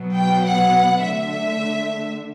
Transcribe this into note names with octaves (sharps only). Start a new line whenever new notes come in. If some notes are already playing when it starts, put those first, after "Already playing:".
Already playing: B2 F#3 B3
G5
F#5
D3 A3 E5